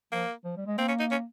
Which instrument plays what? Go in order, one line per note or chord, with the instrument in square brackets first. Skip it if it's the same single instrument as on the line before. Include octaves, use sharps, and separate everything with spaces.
[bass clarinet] F3 [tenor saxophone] A#3
[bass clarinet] F3
G3
G#3
[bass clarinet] A#3 [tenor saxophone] C4
[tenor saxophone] C#4
D#4
C#4